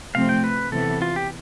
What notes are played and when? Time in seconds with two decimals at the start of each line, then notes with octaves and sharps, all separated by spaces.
0.14 C3 F3 A3 C4 F5
0.29 G5
0.44 B4
0.72 C3 E3 B3 A4
1.02 F4
1.16 G4